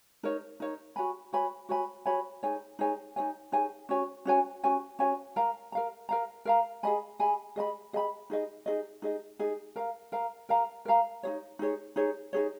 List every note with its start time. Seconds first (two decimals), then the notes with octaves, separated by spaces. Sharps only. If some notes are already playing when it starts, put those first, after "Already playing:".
0.23 D#4 A#4 C#5
0.60 D#4 A#4 C#5
0.96 F#4 C#5 G#5 B5
1.33 F#4 C#5 G#5 B5
1.69 F#4 C#5 G#5 B5
2.06 F#4 C#5 G#5 B5
2.43 D#4 G#4 C#5 G#5
2.79 D#4 G#4 C#5 G#5
3.16 D#4 G#4 C#5 G#5
3.52 D#4 G#4 C#5 G#5
3.89 C#4 F#4 C#5 G#5
4.25 C#4 F#4 C#5 G#5
4.63 C#4 F#4 C#5 G#5
4.99 C#4 F#4 C#5 G#5
5.36 A#4 F5 A#5
5.72 A#4 F5 A#5
6.09 A#4 F5 A#5
6.45 A#4 F5 A#5
6.83 G#4 D#5 G#5 B5
7.19 G#4 D#5 G#5 B5
7.56 G#4 D#5 G#5 B5
7.93 G#4 D#5 G#5 B5
8.30 D#4 G#4 D#5
8.66 D#4 G#4 D#5
9.02 D#4 G#4 D#5
9.39 D#4 G#4 D#5
9.76 A#4 F5 A#5
10.12 A#4 F5 A#5
10.49 A#4 F5 A#5
10.85 A#4 F5 A#5
11.23 D#4 G#4 C#5
11.59 D#4 G#4 C#5
11.96 D#4 G#4 C#5
12.33 D#4 G#4 C#5